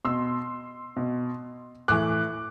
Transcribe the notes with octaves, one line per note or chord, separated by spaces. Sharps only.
B2 C6 E6
B2
A2 E3 D6 F#6